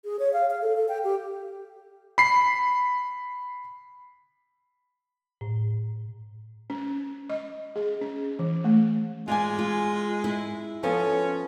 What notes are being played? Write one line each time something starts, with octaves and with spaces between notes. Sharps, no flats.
G#4
C#5
F5
F5
A4
A4
G5
G4
B5 C7
A2
C#4
D#5
G#4
C#4
E3
A3
G#3 F4 D5 G#5
F4
E4
F3 B3 C#4 A4